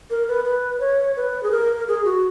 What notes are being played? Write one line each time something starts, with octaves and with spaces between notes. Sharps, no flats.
A#4
B4
B4
C#5
B4
G#4
A#4
G#4
F#4